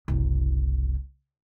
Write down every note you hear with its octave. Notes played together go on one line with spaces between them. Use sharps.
F#1 C2